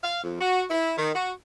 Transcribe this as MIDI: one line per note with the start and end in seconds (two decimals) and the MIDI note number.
0.03 0.22 77
0.23 0.40 41
0.41 0.63 66
0.70 0.92 64
0.97 1.10 51
1.14 1.31 66